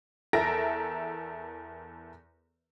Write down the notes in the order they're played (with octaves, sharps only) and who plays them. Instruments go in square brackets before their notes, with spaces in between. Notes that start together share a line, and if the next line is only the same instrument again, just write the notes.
[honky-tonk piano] E2 A4 A#4 E5 A#6 D7